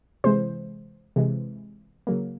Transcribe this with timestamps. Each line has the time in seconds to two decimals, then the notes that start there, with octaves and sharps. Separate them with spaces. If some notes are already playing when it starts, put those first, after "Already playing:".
0.24 C3 E3 G#3 C5
1.16 C3 E3 G#3
2.07 C#3 F#3 A#3